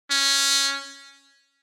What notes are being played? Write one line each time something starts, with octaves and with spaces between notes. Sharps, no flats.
C#4